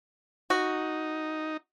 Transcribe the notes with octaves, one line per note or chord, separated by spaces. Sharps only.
D#4 F#4